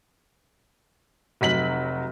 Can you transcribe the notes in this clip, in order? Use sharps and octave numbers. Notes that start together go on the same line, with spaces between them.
F1 F#3 B6 F#7